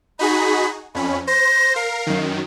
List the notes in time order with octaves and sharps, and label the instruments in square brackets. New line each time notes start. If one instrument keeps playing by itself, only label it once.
[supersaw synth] D#4 F#4 G#4 [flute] B5
[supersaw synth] F2 C#4 [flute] B5
[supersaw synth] C5 [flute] A#6
[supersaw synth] A#4 [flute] F5
[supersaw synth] F#2 D#3